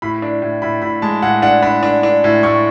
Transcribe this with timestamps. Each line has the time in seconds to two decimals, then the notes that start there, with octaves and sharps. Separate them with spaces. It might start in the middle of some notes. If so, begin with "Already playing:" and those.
0.02 A2 B5
0.22 D4
0.42 A2
0.62 A2 B5
0.82 A2 B5
1.02 G#3 A5
1.22 A2 F#5
1.42 D4 F#5
1.63 D4 B5
1.83 D4
2.03 D4
2.24 A2
2.43 A2 C#6